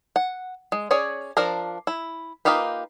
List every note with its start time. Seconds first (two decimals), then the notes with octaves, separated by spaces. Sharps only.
0.16 F#5
0.72 G#3
0.91 C#4 G#4 C#5 D5
1.37 F3 D4 A#4 D5 A#5
1.87 E4
2.45 A#3 D#4 F4 G4 B4